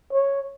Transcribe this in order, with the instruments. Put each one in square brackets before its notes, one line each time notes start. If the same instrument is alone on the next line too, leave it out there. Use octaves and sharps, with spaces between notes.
[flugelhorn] C#5